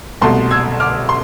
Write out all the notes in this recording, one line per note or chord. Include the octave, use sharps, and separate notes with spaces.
C2 B2 A3 A5 C6
E6 G#6
D6 F6
C6